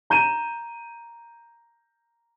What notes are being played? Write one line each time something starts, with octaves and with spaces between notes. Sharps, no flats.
A#5 G6 D#7 E7